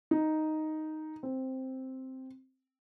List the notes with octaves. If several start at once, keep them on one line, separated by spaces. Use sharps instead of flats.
D#4
C4